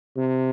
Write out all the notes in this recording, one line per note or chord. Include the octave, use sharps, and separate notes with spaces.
C3